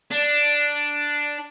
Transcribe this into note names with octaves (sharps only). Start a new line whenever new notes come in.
D4